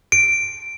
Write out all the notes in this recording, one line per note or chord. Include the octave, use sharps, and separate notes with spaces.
D7